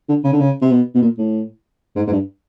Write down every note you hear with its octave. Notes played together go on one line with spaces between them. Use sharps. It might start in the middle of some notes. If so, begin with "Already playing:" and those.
D3
C#3
D3
C#3
C3
B2
B2
A#2
A2
G#2
G#2
G2